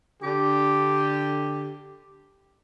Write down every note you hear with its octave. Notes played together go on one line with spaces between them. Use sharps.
D3 G4